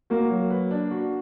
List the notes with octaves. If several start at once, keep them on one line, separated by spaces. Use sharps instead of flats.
A#3 F#4
F#3
B4
D4
F#4